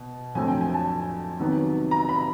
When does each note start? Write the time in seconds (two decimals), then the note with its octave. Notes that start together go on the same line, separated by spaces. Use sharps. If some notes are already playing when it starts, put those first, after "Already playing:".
Already playing: B2
0.35 F2 D3 F#3 A3 C4 G#5
0.48 G5
0.61 G#5
0.74 A5
1.39 C3 D#3 F#3 B3
1.91 A#5
2.09 B5